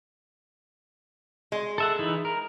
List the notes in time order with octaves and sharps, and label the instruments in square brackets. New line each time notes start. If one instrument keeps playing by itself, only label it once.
[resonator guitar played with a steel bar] G#3
[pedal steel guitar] A4 E5 F#5
E3 D#4 E4
A#4